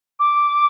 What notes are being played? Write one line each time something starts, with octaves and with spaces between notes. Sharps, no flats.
D6